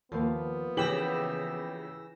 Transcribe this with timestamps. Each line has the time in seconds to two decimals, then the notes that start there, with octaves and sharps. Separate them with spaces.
0.12 D#2 F3 A#3 B3
0.77 C#3 E3 G4 E6 A#6 F#7